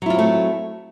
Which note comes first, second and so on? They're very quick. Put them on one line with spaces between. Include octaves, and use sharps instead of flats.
F#3 E4 F4 C4 A3